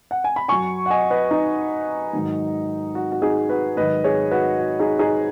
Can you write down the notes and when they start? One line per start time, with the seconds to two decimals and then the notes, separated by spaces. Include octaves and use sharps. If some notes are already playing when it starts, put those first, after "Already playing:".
0.11 F#5
0.24 G#5
0.36 B5
0.48 F#2 F#3 G#5 C#6
0.86 F#5
0.90 D#5 G#5
1.10 B4 D#5
1.31 D#4
2.13 G#2 D#3 F#3
2.95 F#4
3.12 F#4
3.22 D#4 G#4
3.49 F#4 B4
3.77 G#2 D#3 F#3 B4 D#5
4.04 G#4 C#5
4.31 F#4 B4
4.59 F#4
4.80 D#4 G#4
4.99 D#4 G#4